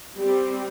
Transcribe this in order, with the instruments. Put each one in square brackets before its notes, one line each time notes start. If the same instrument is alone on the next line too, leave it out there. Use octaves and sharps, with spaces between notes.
[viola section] G3 C4